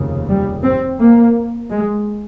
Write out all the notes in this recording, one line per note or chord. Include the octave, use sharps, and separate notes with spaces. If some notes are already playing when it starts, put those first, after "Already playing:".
Already playing: F1 D#2 C#3
G3
C4
A#3
G#3